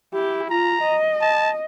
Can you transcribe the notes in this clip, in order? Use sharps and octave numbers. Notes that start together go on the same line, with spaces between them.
E4 G4
F4 A#5
D#5
A5